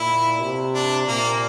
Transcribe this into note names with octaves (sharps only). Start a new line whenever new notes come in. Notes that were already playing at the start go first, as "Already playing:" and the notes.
Already playing: A#2 E4
C3
D4
A#2 A#3